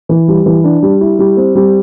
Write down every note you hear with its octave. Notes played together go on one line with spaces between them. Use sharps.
E3
G3
E3
D4
G3
E4
G3
C4
G3